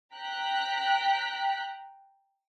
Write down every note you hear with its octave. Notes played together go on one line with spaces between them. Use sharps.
G5 A#5 F#6 B6